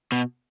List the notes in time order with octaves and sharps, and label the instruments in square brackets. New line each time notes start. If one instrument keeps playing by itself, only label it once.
[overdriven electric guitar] B2